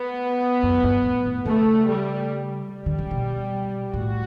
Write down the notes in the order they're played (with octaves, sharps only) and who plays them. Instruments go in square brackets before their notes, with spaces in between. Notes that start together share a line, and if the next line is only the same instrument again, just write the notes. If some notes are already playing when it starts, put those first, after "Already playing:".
Already playing: [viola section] B3
[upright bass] F#2
A2
G2
A2
A2
[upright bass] C#3 [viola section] A3
[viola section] G3
G3
[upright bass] D3
C#3
B2
[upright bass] A2 [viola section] F#4